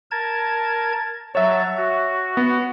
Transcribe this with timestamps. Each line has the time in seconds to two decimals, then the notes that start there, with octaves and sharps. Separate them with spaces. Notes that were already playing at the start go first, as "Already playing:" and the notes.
0.11 A#4 A5 G#6
1.35 F#3 C#5 E5 A5
1.77 F#4
2.37 B3